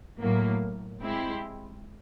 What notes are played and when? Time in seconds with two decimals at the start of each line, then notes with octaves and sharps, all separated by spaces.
0.20 A2 F#3 A#3
1.03 G#3 C4 E4 G4